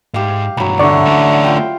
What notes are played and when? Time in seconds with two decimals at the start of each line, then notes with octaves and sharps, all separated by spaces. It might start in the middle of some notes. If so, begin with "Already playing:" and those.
0.14 G#2 G4 F5
0.57 B1 G2 F#3 B5
0.79 D3 F#3 E4 D5 C#6
1.06 A3 C#4
1.44 F4 G5